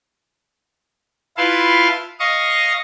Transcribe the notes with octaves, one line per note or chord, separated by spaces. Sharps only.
E4 F4 B4 F5 A5 C6
D#5 F5 C#6 D#6